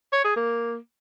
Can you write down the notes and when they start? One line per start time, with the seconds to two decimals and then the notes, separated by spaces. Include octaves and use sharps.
0.13 C#5
0.25 G#4
0.36 A#3